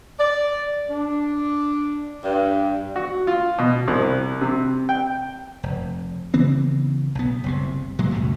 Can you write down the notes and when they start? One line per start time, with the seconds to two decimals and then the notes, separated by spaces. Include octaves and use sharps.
0.20 D5
0.90 D4
2.24 G2
2.96 F#4
3.27 F4
3.58 B2
3.88 C2
4.41 C3
4.89 G5
5.63 F1
6.34 C#3 E3 B3 C4
7.15 B1 B3
7.44 F#1 C2 C3
7.99 A#2 F#3 G#3
8.12 C#2 F#2 B2 A3